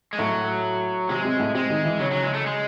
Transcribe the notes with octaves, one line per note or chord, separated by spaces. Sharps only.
G#3
A2 F#3 A3
C3 G#3 C4
C3 C4
A2 A3
C3 G#3 C4
D#3 D#4
E3 E4
C#3 F#3 C#4
F#3
G#3
A3
G#3